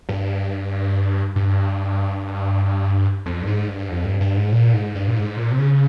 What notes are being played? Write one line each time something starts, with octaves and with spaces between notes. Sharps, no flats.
G2
G2
F2
G2
G#2
G2
F2
G2
G2
G#2
A#2
G#2
G2
A#2
G#2
A#2
C3
C#3